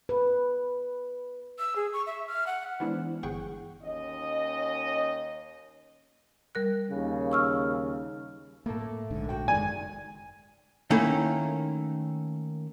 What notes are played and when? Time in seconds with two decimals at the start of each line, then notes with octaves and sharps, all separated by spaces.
0.09 B4
1.59 E6
1.76 G#4
1.93 C#6
2.07 E5
2.28 F6
2.47 F#5
2.80 E3 G#3 B3 D4 E4 C5
3.23 G1 E3 G#4 F#5 G5 C#6
3.83 D#2 C#4 D#5
6.55 G3 A#4 F#6
6.91 D#2 C#3
7.32 C#6 E6 F6
8.66 A2 A3 A#3 A4
9.11 A#1 G#2 D3
9.29 F#4 G5
9.48 F#1 D#3 G#3 D5 G#5
10.90 D#3 A3 A#3 C#4 E4